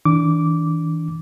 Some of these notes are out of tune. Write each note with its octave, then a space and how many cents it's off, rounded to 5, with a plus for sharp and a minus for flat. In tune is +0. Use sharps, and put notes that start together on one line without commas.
E3 -40 D4 -15 D6 -10